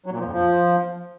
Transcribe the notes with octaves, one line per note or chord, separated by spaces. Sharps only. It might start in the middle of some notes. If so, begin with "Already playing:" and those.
F#3
A#2
F3
F2
F3